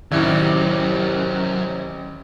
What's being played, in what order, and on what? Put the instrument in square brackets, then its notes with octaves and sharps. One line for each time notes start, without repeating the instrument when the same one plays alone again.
[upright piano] A1 E4 G#6 [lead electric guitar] F#2 [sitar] C3 G3 [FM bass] D#3